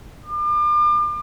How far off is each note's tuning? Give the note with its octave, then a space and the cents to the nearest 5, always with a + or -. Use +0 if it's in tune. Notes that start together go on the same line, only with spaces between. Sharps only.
D6 +40